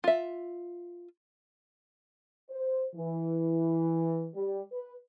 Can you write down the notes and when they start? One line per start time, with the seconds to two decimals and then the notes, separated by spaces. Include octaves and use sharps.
0.04 F4 E5
2.50 C5
2.95 E3
4.35 G3
4.72 B4